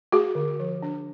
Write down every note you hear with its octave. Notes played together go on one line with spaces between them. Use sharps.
A3 F#4 G#4
D3
F3
D4